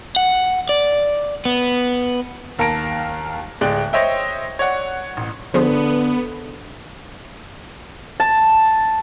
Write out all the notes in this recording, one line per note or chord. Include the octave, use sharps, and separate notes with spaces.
F#5
D5
B3
D#2 A#4 A5 A#6 D7
D1 G#3 D5 G5 F#6
C5 C#5 D#5 E5 G5
C#5 D5 F#5
A1
D3 F3 B3 G#4 C5
A5